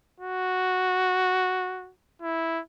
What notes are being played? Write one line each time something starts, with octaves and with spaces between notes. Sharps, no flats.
F#4
E4